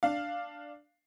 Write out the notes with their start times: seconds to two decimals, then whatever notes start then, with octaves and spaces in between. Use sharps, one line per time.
0.03 D4 F5